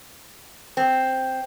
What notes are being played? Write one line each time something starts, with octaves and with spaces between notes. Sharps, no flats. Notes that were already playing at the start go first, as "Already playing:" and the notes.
C4